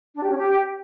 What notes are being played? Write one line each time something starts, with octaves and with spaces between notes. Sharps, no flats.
D4
G4
C#4
G4